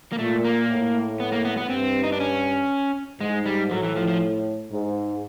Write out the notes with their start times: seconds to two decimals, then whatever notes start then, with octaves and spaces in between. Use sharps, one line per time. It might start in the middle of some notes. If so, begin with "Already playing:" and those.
0.12 A#3
0.19 A#2 A3
0.45 A#3
0.69 A2
1.20 B3
1.32 A#3
1.45 B3
1.57 B3
1.69 G2 C4
2.03 D#4
2.12 D4
2.20 C#4
3.20 G#2 G#3
3.46 G3
3.70 A2 F#3
3.83 E3
3.96 F3
4.08 F3
4.71 G#2